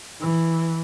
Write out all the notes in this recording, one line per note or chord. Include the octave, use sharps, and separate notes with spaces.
E3